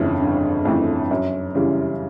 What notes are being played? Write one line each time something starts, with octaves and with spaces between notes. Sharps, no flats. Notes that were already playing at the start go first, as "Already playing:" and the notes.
Already playing: G1 F2 C#3 E3 A3
G1
F2 C#3 E3 A3
F#2
C#3 E3 G3